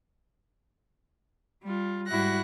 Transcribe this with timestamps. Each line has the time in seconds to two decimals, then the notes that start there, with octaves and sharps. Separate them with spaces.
1.63 G3 F4
2.08 G#2 G3 E4 F#4 F#6 A#6